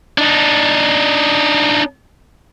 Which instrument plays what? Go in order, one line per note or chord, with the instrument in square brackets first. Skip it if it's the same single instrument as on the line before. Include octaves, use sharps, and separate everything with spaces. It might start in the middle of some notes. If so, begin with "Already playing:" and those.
[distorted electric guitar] D4 D#4